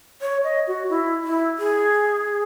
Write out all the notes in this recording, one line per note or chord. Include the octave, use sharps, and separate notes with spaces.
C#5
D#5
F#4
E4
E4
G#4